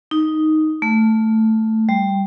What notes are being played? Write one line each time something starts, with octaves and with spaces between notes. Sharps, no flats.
D#4
A3
G3